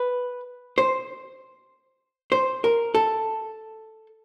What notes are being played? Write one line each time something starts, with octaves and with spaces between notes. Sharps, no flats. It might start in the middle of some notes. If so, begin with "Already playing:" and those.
Already playing: B4
C5
C5
A#4
A4